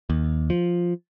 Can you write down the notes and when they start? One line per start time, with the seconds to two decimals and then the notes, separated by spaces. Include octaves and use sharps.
0.10 D#2
0.50 F3